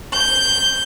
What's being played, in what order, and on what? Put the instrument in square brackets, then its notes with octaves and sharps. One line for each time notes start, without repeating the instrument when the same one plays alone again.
[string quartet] G6